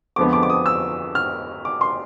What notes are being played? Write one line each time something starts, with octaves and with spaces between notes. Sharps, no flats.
F2 D3 F3 G#3 B3 D6
D6
D6
D#6
E6
F6
D6
C6